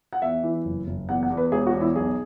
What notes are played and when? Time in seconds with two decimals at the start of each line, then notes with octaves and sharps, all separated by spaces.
0.13 F#5
0.22 E2 E5
0.43 E3
0.65 F#1
0.87 F#1
1.09 E2 F#5
1.23 F#5
1.30 E2
1.37 B4
1.52 E1 G#4
1.67 F#4
1.74 E2
1.81 E4
1.95 B1 G#4